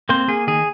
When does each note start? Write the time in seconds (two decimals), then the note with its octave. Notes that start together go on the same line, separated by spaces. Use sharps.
0.09 A#3 C4 C5
0.28 A#3 G#4
0.47 D#3 G#4